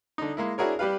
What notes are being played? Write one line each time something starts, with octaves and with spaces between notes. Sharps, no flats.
D3 D#4
G#3 A#3 E4
D4 E4 F#4 G#4 A#4 C#5
G3 G4 B4 F5